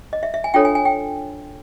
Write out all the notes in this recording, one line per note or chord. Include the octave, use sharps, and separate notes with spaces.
D#5
E5
E5
G#5
D4 F4 A4 C#5 G5
G#5
G#5
G5